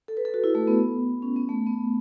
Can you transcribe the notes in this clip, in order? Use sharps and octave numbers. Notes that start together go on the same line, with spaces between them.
A4
B4
A4
F#4
E4
A3
B3
C#4
B3
A3
B3